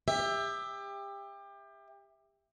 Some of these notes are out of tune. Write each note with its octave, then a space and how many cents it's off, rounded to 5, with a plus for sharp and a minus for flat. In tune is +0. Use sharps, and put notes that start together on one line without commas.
G4 +30 E5 +0